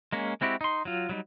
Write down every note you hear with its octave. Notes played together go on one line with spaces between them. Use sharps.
G#3 A#3 C#4
G#3 C4 E4 F#4 G4
D#4 C6
F#3 F4
F#3 G3 D#4